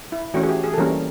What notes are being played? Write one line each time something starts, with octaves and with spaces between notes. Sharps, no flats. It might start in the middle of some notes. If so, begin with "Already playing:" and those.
E4
E3 A3 C#4 F#4
G#4
G4
G#4
A4
E3 G3 A#3 C#4 A#4